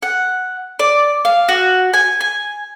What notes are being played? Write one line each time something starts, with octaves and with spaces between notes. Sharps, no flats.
F#5
D5
F5
F#4
G#5
G#5